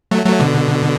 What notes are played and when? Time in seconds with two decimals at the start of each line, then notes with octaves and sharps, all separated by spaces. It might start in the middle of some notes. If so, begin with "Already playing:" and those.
0.11 F#3 A3
0.26 F#3 A3
0.40 B2 D3